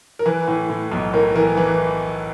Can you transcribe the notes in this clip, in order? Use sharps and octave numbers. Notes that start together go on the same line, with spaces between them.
A#4
E3 B4
A2
A2
B1
A2 A#4
E3 A#4
E3 B4